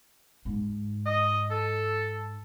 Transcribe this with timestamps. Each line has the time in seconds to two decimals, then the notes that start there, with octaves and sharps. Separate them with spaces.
0.45 G#2
1.06 D#5
1.50 A4